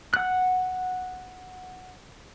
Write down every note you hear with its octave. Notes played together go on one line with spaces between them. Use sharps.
F#5 F#6